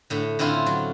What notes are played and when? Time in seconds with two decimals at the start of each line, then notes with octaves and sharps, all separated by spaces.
0.10 A2 D3
0.39 D3 C4 C#4 E4 F4
0.67 F#3